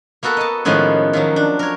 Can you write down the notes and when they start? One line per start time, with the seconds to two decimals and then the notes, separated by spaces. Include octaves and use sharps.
0.23 A#3 B3 F#4 A4 B4
0.37 D#5 A5
0.65 A2 D#3 F3 G#3 B3 C#4
1.13 D#3 F3 F#3
1.36 D4
1.59 A#4 C#5